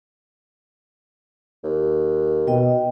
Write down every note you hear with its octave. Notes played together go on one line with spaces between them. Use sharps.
D#2
B2 D#5 G5